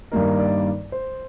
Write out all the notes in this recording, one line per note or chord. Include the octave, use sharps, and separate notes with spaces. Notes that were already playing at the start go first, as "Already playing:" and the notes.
G2 D#3 G3 A#3 D#4 A#4
D5
C5